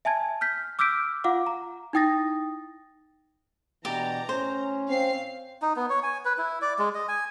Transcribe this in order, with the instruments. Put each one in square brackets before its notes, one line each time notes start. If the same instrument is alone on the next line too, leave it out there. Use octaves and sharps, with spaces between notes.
[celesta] E5 G#5 A5 G#6
F6 G6 B6
D6 E6 F6 G6 B6 D7
F4 F5 F#5 D6
A#5
D#4 E4 G5 D#6 A6 A#6
[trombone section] B2 E3 D4 [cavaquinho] G4 D5 [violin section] A#5
[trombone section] A2 C#4 [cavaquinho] C5
[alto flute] C4 [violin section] F5 C7
[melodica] D#4
B3
C#5
G#5
B4
E4
D5
G#3
D#5
G#5